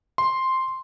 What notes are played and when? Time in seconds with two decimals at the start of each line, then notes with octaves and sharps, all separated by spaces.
0.18 C6